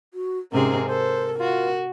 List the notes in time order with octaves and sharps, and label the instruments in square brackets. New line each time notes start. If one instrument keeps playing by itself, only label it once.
[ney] F#4
[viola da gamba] G#2 C3 G#4 [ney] C#4 [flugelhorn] A#4
[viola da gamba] A4 [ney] A#4 [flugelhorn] C5
[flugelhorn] F4 [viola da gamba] F#4